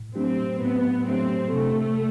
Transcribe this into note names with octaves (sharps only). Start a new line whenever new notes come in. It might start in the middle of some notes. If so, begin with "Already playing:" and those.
Already playing: A2
F#3 A3 C4 D4 G4
A2 B3
F#3 A3 C4 D4 G4
C3 A3